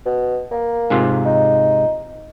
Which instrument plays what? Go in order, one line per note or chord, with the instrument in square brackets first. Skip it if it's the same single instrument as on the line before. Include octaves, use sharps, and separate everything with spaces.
[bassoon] B2
A#3
[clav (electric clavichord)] G#2 C3 F4
[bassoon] D#4